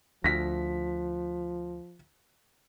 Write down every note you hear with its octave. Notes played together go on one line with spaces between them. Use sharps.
D2 F3 A#6 B6